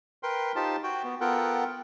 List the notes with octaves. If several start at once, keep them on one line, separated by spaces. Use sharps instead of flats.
A#4 B4 G5 C6
D#4 F4 G4 C5 A5
F#4 G5
B3
B3 F4 A4 A#4 F#5 G5